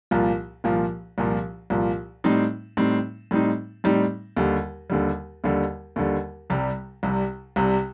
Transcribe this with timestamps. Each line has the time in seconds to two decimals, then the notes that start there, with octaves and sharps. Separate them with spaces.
0.11 C2 A#2 F3
0.64 C2 A#2 F3
1.18 C2 A#2 F3
1.70 C2 A#2 F3
2.24 A2 G3 C4 D#4
2.77 A2 G3 C4 D#4
3.31 A2 G3 C4 D#4
3.84 A2 G3 C4 D#4
4.37 D#2 D3 G3
4.90 D#2 D3 G3
5.44 D#2 D3 G3
5.96 D#2 D3 G3
6.50 C2 C3 G3
7.03 C2 C3 G3
7.56 C2 C3 G3